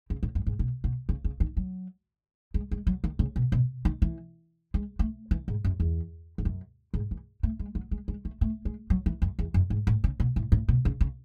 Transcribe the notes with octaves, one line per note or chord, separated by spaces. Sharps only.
C#3
A2
F#2
G#2
B2
B2
C#3
C#3
D#3
F#3
G#3
G#3
F#3
D#3
C#3
B2
B2
D#3
E3
G#3
A3
E3
G#2
F#2
E2
E2
F#2
G#2
E3
A3
G#3
F#3
G#3
G#3
A3
A3
G#3
F#3
E3
F#2
E2
F#2
G#2
A2
C#3
B2
A2
A2
B2
C#3
C#3